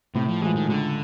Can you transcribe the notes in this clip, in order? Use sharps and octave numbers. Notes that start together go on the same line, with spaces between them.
A2 C3
F3
E3 F3 G#3
D#3
C#2 D3